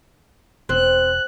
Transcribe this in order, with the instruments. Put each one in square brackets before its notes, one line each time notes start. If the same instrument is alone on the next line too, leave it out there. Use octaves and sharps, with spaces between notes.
[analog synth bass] E1 [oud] C4 [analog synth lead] F#6